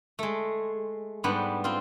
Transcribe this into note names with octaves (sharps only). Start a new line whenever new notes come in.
G#3 A3
G#2 G3 B3 D4
C4 F4